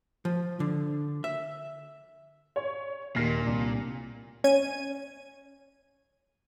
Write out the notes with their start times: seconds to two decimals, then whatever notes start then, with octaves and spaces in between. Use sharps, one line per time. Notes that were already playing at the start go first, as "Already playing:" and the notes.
0.25 F3
0.60 D3
1.24 E5
2.56 C#5
3.16 D#2 A#2 D#3 F6 A#6 C7
3.47 C2 D4
4.44 C#4 G#6 D#7